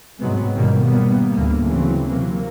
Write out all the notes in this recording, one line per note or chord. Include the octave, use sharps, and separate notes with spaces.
G#2 C3 F#3 G#3 B3 C4
G#1 B2 D#3 G3 A#3
G3 A#3 B3
D2 A2 A#3
C#3 E3 F#3 C4
C3 F#3 A#3